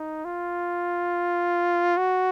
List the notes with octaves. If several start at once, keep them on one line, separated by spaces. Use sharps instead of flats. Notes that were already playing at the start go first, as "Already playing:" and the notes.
Already playing: D#4
F4
F#4